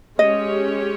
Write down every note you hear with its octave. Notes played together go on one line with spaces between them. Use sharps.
G#3 C#4 G4 C#5 D#5